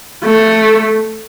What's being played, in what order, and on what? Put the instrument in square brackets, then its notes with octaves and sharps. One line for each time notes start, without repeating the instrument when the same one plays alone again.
[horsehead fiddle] A3